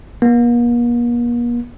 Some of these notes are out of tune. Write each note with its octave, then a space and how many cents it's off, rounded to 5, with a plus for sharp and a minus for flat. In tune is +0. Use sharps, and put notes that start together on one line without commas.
A#3 +45